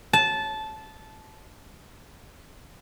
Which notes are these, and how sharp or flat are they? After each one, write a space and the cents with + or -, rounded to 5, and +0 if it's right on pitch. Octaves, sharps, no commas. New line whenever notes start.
A5 -15